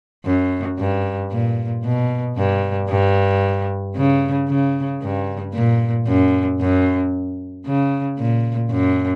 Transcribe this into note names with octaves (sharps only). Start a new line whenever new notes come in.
F#2
G2
A#2
B2
G2
G2
C#3
C#3
G2
A#2
F#2
F#2
C#3
A#2
F#2